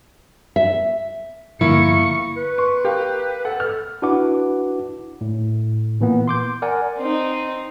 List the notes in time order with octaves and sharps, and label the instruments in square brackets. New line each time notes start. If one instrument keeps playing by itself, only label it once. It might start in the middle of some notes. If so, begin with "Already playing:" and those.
[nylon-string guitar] E5
[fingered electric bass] G2 D3 F3 [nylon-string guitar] A#3 [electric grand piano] E4 [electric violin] C#6 C#7
[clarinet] B4
[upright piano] C6 C#6
G4 A#4 F5
[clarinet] A4 [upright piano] F#5
[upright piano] F6
[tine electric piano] D4 E4 F#4 B4 F#5 D6
A2
A#2 E3 A#3 B3
C6 D6 G6
A#4 D5 F#5 G#5
[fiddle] C4 D#4